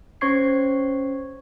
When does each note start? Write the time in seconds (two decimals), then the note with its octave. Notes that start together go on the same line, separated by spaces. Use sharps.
0.21 C#4 C5 C#5 C#6 G#6 C7